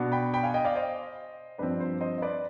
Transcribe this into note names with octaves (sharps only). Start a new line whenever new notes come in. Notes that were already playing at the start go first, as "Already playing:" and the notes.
Already playing: B2 B3 D4
G5 B5
G5 B5
F5 G#5
D#5 G5
D5 F5
C5 D#5
G2 F3 C4 B4 D5
C5
C5 D#5
D#5
B4 D5